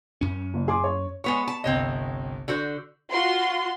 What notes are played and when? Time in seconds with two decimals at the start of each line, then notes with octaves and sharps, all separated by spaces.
0.21 F#2 C#4
0.54 F#1
0.68 G#4 C6 D6
0.84 C#5
1.24 G#3 B3 C#5 C#6 F7
1.48 A5
1.64 G1 C2 C4 C#5 D#5
2.48 D3 F#4 C5
3.10 F4 F#4 C6